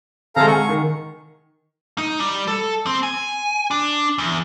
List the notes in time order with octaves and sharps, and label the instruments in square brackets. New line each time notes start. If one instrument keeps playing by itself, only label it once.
[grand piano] C3 G#3 [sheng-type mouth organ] A4 F5 A#5
[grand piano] F#5 G#5 [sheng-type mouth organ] C#6
[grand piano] D#3
[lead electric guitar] D#4
G3
A4
C4
G#5
D4
E2